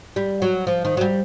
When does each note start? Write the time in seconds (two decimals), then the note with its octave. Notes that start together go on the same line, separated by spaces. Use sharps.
0.16 G3
0.42 F#3
0.67 F3
0.85 D#3
0.97 F#3
1.01 G3